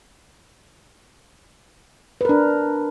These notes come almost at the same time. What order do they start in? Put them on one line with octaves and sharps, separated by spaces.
B4 A#4 D4